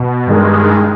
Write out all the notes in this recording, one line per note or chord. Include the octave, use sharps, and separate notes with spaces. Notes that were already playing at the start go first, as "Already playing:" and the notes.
Already playing: B2
G2 D#3 G#3